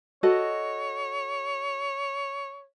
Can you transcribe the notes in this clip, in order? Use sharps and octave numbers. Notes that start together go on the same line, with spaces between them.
F#4 A4 C#5 D#5